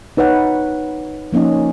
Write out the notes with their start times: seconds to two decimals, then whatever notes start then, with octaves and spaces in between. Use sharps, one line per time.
0.17 D#4 B4 C#5 F#5
1.33 F3 A#3 C#4 D#4 D#5